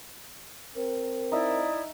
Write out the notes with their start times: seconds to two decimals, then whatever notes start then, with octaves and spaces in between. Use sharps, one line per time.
0.76 C4 A#4
1.32 D#4 E4 D5 E5 D#6